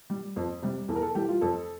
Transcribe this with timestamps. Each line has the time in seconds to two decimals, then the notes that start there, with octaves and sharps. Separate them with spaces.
0.10 G3
0.36 F2
0.62 C3 G3
0.88 E2 A4
0.95 A#4
1.02 A4
1.15 E3 G3 G4
1.28 F4
1.41 F2 A4